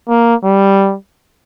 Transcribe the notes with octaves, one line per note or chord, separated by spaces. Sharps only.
A#3
G3